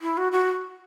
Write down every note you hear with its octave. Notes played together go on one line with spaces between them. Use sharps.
E4
F#4
F#4